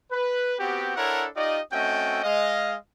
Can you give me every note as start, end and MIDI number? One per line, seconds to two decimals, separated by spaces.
0.12 0.55 71
0.60 0.96 59
0.60 0.96 60
0.60 0.96 66
0.60 0.96 67
0.96 1.27 62
0.96 1.27 64
0.96 1.27 69
0.96 1.27 70
0.96 1.27 73
0.96 1.27 78
1.37 1.59 63
1.37 1.59 65
1.37 1.59 67
1.37 1.59 74
1.37 1.59 75
1.73 2.21 57
1.73 2.21 60
1.73 2.21 61
1.73 2.21 66
1.73 2.21 75
1.73 2.21 79
2.24 2.75 56
2.24 2.75 75
2.24 2.75 77